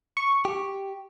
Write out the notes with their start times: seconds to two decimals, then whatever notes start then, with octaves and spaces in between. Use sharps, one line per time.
0.17 C#6
0.45 G4